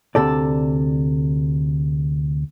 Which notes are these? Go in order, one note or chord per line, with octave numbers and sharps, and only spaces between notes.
D2 C3 A4 D5